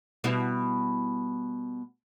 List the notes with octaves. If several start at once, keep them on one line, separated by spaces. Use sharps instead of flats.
B2 G3 E4